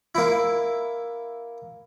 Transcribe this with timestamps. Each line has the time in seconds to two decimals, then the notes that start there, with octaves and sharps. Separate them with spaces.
0.15 A#3 E4